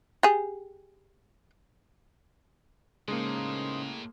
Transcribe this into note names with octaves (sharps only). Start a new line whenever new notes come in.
G4 G#4
A2 C#3 G#3 A#3 D#4 C5